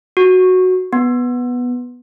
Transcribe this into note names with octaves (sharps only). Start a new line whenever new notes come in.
F#4
B3